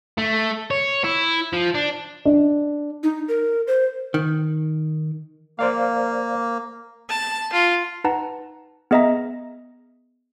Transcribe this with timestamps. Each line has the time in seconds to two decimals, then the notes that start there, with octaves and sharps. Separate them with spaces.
0.18 A3
0.71 C#5
1.04 E4
1.53 F3
1.75 D4
2.25 D4
3.03 D#4
3.28 A#4
3.67 C5
4.14 D#3
5.59 A#3 C5 D5 F5
7.09 A5
7.53 F4
8.04 D#4 B4 F#5 A5 A#5
8.91 B3 G#4 D#5 E5 A#5 A#6